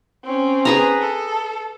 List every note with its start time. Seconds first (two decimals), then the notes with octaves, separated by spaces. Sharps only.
0.24 C4 C#4
0.65 G#4 B4 A#5
1.01 A4